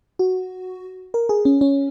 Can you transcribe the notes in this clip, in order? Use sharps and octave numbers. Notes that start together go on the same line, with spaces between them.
F#4
A#4
G#4
C#4
C#4